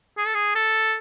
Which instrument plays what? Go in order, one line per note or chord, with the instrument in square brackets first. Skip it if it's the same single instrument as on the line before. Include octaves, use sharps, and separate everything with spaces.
[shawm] G#4
A4
G#4
A4